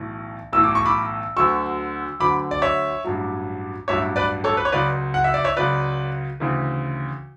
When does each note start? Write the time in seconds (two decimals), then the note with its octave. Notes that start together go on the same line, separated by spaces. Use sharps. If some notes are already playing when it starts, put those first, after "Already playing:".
Already playing: B1 A2 E3
0.53 B1 A2 E3 E6
0.63 D6
0.75 C#6
0.86 B5 D6
1.37 D2 D3 F#3 C#6 E6
2.20 D2 D3 F#3 B5 D6
2.51 D5
2.62 C#5 E5
3.04 A1 G2 F#3
3.88 A1 G2 F#3 C#5 E5
4.16 B4 D5
4.44 A4 C#5
4.57 B4
4.65 C#5
4.72 C#2 C#3 F#3 B4 D5
5.14 F#5
5.24 E5
5.34 D5
5.44 C#5 E5
5.57 C#2 C#3 F#3 B4 D5
6.40 D2 C#3 E3